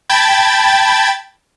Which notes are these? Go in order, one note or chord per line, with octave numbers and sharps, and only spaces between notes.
G5 A5 B5 G#6 A6